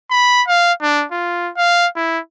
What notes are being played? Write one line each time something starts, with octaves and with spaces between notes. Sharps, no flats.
B5
F5
D4
F4
F5
E4